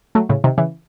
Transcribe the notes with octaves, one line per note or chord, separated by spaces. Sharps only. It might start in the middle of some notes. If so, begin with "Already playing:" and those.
F#3 A3
A2 C#3
C3 D#3
C#3 E3